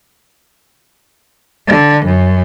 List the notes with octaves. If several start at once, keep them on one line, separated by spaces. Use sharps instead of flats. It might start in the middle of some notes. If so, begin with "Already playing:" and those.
D3
F#2